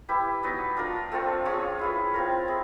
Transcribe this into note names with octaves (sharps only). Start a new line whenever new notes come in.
E4 G4 B4
F#3 B3 D#4
D4 F4 A#4
A3 C4 F4 A4
C#4 F4 G#4 C#5
E4 G#4 B4
C4 F4 A#4
E4 G#4